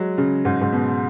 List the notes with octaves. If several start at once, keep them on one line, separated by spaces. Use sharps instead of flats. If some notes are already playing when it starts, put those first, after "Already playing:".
Already playing: F#3 G#3
C#3
G#2
G#2
B2